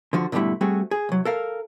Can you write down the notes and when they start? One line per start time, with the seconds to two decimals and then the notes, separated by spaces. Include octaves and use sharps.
0.13 D3 F3 F#4
0.32 G#2 B2 D3 G3 A3 E4
0.61 G3 A3 C4 F#4 G#4
0.91 G#4
1.09 C2 F#3
1.25 A4 A#4 F5